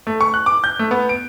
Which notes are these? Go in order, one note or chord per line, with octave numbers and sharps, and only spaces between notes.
A3
C#6
F#6
D6
G6
A3
B3
D7